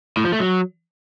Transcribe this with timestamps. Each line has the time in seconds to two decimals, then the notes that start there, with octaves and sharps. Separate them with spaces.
0.17 A2
0.25 F3
0.32 A3
0.40 F#3